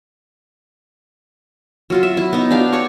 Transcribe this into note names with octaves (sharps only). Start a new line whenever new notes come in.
F#3 F4 F#4
E5
E4
B3 D#4
D4 G4 F5
C#5 A5 C#6